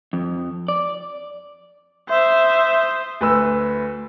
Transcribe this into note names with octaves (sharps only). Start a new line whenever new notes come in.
F2
D5
C5 E5 D#6
D2 B4 E6